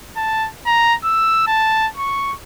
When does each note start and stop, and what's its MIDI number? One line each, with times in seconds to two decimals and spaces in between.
0.17 0.48 81
0.66 0.94 82
1.04 1.46 88
1.47 1.87 81
1.96 2.34 85